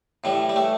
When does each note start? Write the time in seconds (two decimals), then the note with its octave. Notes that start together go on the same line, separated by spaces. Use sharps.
0.24 A2 E3 G3
0.49 G3
0.56 A3